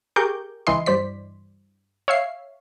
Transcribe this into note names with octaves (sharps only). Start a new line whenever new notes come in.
G4 G#4 A#4 C#6 D6 G6
C#2 E3 D#5 C6
G2 C5 D5 B6
C#5 E5 F5 C7